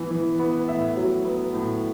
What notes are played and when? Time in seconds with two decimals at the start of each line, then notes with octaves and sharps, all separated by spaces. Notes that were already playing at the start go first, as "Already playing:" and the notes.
Already playing: E3 B3 E4
0.11 E3
0.39 B3
0.68 A2 E5
0.97 F#3
1.25 B3
1.54 A2